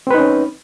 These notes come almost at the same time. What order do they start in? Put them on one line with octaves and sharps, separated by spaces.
C4 B4 D#4 C#4